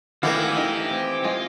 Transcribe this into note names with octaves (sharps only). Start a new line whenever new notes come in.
D#3 E3 G#3 A3 F#4 G4 A#4 F5
D#4 G4
C4
G#3 F4